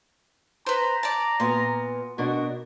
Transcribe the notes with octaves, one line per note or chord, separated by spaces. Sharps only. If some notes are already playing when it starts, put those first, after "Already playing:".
B4 C5 A#5
D5 A5
A#2 B3 C6
B2 D4 F#4 A#4